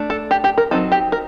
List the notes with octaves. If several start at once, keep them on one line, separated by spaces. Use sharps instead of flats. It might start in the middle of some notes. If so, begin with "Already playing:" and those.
Already playing: A3 D4
A4
G4
G4
A#4
F#3 C4 D#4 A4
G4
A#4